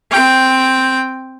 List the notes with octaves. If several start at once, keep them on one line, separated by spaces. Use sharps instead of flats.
C4 G5